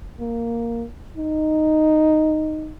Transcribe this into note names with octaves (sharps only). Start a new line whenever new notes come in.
A#3
D#4